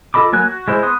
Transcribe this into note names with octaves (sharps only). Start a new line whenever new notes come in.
F4 A4 D#5 B5 D6
F#3 A#3 G#5 F#6
F#4
G#3 E4 C5
B3 C6 D#6 F#6